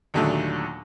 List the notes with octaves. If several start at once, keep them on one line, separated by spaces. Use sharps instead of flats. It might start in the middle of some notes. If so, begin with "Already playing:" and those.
D#2 A#2 D3 F#3 A3 D#4